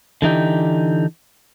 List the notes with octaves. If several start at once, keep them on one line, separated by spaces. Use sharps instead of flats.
D3 E3 D#4 G4